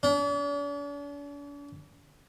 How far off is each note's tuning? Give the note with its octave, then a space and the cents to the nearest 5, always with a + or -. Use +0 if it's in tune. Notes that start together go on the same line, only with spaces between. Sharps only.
D4 -45